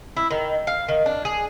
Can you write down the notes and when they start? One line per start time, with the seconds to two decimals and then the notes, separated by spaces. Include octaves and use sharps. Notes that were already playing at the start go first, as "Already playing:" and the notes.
0.17 E4
0.31 D#3
0.67 F5
0.88 D#3
1.06 D4
1.25 G#4